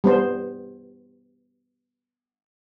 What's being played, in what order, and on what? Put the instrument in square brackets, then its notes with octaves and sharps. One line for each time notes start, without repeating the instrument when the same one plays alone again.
[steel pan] G3 B3 C5